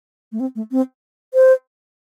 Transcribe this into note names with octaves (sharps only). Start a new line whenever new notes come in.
A3
C4
A3
C4
C5